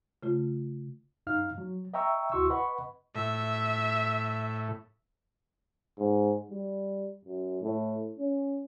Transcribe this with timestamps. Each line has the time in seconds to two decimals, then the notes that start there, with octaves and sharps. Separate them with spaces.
0.23 C#3 A3 F4
1.27 F#2 D#4 F5 F6
1.58 F#3
1.94 D#5 E5 G5 A#5 C#6 E6
2.32 D2 E4 F#4 C6 C#6 E6
2.50 B4 D#5 F#5 B5 C#6
3.15 A2 E5
5.98 G#2
6.50 G3
7.25 F#2
7.62 A2
8.18 C#4